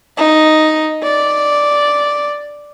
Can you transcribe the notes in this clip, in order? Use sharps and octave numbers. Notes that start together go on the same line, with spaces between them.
D#4
D5